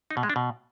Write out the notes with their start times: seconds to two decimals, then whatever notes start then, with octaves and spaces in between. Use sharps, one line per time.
0.11 D#4
0.17 B2
0.23 G#3
0.30 D4
0.36 B2